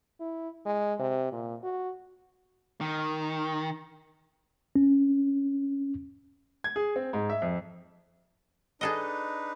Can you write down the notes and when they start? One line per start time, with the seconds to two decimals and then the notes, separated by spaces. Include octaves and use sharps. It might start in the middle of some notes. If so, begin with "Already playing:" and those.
0.20 E4
0.66 G#3
0.99 C3
1.32 A#2
1.64 F#4
2.81 D#3
4.76 C#4
6.64 G#6
6.76 G#4
6.96 C4
7.13 G#2
7.30 E5
7.42 F2
8.81 D4 D#4 G#4 A4 B4 D#5